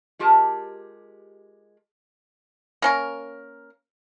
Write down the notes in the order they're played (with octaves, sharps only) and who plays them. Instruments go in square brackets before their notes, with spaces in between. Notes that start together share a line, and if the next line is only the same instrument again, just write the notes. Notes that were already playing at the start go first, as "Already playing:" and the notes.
[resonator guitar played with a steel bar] G#3 F4 G4 A#4 A5
[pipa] A#3 C#4 A#4